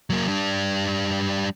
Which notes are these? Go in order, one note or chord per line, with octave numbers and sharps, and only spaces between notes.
F#3 A#3
G3 D4